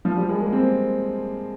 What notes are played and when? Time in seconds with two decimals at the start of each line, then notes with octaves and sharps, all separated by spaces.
0.05 F3
0.17 G3
0.29 G#3
0.40 A#3
0.52 C4